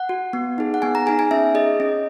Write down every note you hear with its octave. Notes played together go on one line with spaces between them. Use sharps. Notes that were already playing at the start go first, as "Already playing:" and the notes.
Already playing: F#5
F#4
B3
D#4 G#4
F#5
B3 G#5
A#5
D#4 G#4 G#5
G#5
C#4 E5
G#4 D#5
C#4